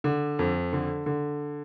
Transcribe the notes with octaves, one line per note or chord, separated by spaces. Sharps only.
D3
F2
D3
D3